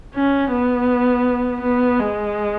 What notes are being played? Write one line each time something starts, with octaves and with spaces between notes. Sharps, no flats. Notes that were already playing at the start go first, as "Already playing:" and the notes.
C#4
B3
B3
G#3